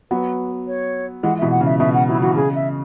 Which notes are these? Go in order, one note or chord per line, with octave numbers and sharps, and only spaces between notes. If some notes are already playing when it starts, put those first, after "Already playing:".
F#3 B3 B4
C#5
E3 G#3 F#5
B2 E3 E5
F#5
C#3
E5
B2 E5
F#5
F#3 E4
E3 F#4
C#3 G#4
E5